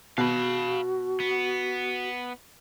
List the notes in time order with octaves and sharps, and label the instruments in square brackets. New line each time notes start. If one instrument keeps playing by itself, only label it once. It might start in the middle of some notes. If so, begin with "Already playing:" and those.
[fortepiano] B2 [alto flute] F#4 [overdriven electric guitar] F5 B5
[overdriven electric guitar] B3